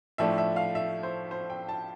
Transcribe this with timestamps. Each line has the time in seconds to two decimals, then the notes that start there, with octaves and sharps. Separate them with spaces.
0.18 A2 F3 A3 D4 E5
0.38 E5
0.56 F5
0.75 E5
1.03 C5
1.31 C5
1.50 G5
1.69 A5